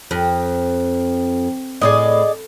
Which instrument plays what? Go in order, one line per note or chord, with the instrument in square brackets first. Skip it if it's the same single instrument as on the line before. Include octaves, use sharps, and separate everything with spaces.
[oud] F2
[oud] A2 [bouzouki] G#4 D5 D#5